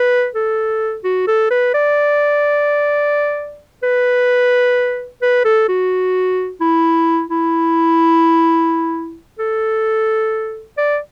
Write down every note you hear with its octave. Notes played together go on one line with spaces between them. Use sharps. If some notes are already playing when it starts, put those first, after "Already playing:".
Already playing: B4
A4
F#4
A4
B4
D5
B4
B4
A4
F#4
E4
E4
A4
D5